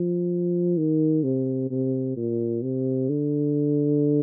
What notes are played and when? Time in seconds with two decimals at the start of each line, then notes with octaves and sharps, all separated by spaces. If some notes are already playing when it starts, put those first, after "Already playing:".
Already playing: F3
0.77 D#3
1.23 C3
1.70 C3
2.16 A#2
2.62 C3
3.09 D3